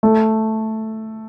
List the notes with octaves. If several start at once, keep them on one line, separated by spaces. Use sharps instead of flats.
A3